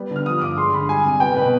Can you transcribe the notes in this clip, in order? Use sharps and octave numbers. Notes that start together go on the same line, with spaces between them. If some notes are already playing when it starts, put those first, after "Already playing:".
Already playing: G3 B3
D3 F6
F3 D#6
G2 D6
G#3 C6
D3 B5
G3 G#5
C3
B3 G5
B2 B4